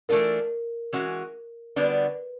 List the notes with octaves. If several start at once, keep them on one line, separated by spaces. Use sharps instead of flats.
E3 A3 D4 F4 A#4
E3 G#3 C#4 F#4
D3 G3 B3 D4 F#4 B4